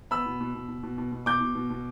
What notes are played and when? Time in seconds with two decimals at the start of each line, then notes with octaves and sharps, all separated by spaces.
0.11 B3 B5 E6
0.26 B2
0.41 B2
0.55 B2
0.69 B2
0.83 B2
0.98 B2
1.12 B2
1.26 B2 D6 G6
1.41 B2
1.55 B2
1.70 B2